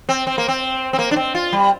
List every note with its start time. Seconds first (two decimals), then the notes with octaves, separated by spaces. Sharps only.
0.09 C4
0.27 C4
0.38 A#3
0.48 C4
0.93 C4
0.99 A#3
1.11 D4
1.16 C4
1.35 F4
1.52 G3